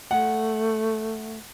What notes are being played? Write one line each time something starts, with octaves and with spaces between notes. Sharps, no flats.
A3 F#5